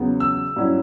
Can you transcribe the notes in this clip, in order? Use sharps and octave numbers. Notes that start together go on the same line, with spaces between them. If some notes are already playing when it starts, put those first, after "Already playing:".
Already playing: E2 C#3 F#3 B3
E6
G2 F#3 C#4 E4